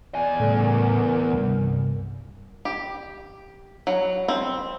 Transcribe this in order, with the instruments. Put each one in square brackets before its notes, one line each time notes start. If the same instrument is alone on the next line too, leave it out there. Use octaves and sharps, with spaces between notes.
[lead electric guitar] E2 G#5 [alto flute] D5
[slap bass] A2 C#3 G3 [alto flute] A4
[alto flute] A#4
[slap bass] C2 G2
[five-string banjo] G4
F#3
C4